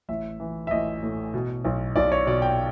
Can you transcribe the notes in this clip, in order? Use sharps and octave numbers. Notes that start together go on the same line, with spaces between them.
A1 E5
E3
E5
A1 D#5
A2
B2
B1
B1 D5
C#5
B2 D5
G5